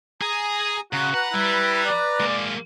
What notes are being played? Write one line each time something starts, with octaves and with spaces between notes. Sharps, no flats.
G#4 G#5 A#5 D#6
C#3 F#4 F#5 A#5 C6
B4 F#5 A#5
G3 E4
D5
G#3 A#3